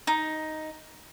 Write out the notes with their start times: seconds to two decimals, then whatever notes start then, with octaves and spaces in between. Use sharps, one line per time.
0.07 D#4